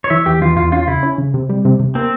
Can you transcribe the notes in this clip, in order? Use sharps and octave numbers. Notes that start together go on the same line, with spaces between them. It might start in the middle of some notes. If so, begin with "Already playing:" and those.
C#5
E3 E5
E2 G4
E3 F4
E2 F4
C#4 F4
C#3 E4
C#4
C#3
C3
G3
C3
C3
A#3 C4